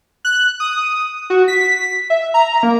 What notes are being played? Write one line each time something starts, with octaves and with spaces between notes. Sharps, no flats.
F#6
D#6
F#4
B6
E5
A#5
A#3